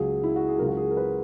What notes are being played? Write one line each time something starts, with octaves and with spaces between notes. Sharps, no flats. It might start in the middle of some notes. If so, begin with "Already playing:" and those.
Already playing: C#2 C#3 F#3 G#4
E4
F#4
G#4
C#2 C#3 F#3 A#4
F#4
G#4
A#4
B4